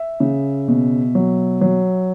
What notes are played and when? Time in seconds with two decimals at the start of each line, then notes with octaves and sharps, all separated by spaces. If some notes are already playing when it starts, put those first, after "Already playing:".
Already playing: E5
0.20 C#3
0.68 B2
1.15 F#3
1.61 F#3